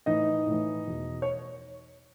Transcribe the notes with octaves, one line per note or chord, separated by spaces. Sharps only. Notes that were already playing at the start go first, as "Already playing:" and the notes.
A2 E3 D#4 D#5
A2 E3
E2 B2
C#5